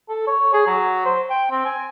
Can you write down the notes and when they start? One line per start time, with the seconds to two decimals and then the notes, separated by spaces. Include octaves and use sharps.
0.09 A4
0.27 C#5
0.53 G#4
0.67 F#3
1.05 C5
1.30 G5
1.51 C4
1.65 G#5